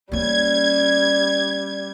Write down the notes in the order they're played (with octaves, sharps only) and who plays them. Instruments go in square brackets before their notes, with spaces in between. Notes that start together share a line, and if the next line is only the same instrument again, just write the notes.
[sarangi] G3 [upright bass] A#3 C#4 [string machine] G#6